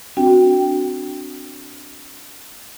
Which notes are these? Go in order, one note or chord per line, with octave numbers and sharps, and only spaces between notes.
C4 D4 F#4 G5